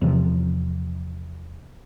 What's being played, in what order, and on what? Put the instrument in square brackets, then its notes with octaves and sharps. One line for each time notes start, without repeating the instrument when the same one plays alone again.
[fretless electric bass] E2 C3 F3